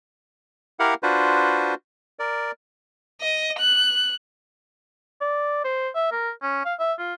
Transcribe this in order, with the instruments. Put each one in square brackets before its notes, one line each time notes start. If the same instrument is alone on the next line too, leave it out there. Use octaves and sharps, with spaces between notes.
[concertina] E4 G4 A#4 F5 F#5
D4 F4 F#4 B4 C5
A#4 D5
[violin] D#5
F#6
[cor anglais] D5
C5
E5
A#4
C#4
F5
E5
F4